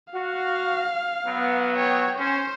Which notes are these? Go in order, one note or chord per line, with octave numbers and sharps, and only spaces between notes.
F#4 F5
F#3 B3
C#5 G5
C#4 C5